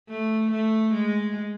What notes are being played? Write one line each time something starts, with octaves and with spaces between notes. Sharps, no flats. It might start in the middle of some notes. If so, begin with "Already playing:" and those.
A3
A3
G#3